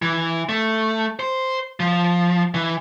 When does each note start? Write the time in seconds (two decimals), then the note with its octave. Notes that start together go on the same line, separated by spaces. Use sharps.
0.02 E3
0.49 A3
1.20 C5
1.80 F3
2.55 E3